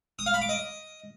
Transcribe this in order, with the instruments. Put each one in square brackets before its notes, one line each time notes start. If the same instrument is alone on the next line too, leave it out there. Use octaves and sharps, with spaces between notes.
[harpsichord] D#6
F5
B5
D6
D#5